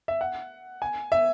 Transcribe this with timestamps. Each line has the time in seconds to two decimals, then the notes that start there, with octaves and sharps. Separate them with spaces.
0.08 E5
0.21 F#5
0.82 G#5
1.12 E5